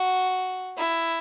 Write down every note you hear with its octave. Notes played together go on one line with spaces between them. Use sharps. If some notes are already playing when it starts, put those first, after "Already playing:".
Already playing: F#4
E4